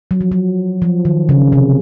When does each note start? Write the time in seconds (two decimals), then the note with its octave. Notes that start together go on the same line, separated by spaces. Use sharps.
0.11 F#3
0.21 F3
0.32 F#3
0.82 F3
1.05 D#3
1.29 C#3
1.52 C3